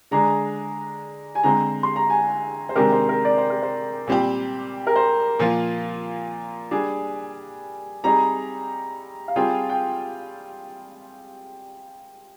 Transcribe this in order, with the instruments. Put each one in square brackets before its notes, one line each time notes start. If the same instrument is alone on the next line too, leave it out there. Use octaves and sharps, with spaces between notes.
[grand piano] D3 G#3 D4 G#4 [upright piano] A#5
[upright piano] G#5
[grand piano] D3 G#3 C4 [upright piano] A#5
[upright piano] C6
A#5
G#5
C5
[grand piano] C3 D#3 G#3 D4 G4 [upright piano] A#4
[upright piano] C5
A#4
D5
C5
A#4
C5
[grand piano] A#2 G3 C4 G4
[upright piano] A#4
C5
[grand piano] A#2 F3 A#3 F4
[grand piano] G3 D4 G#4 [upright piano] G#5
[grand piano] G3 C4 D#4 G#4 [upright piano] A#5
[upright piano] F5
[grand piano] G3 C4 F4 G#4 [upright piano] G5
[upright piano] G5